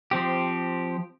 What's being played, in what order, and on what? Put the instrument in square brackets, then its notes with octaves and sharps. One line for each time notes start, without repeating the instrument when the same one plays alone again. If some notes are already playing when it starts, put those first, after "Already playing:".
[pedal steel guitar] F3 C4 G4